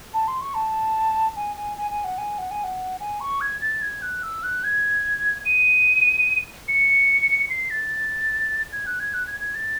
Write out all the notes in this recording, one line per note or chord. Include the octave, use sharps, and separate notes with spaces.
A5
C6
C#6
A5
G#5
G#5
G#5
G#5
F#5
G#5
F#5
G#5
F#5
G#5
C#6
G#6
A6
G#6
F#6
E6
F#6
G#6
D#7
C#7
C7
A6
G#6
F#6
G#6
F#6
G#6
G#6
A6